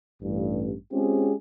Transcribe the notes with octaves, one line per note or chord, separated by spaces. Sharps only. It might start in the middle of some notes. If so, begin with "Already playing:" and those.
A1 G2
G#3 C4 C#4 F4 G4 G#4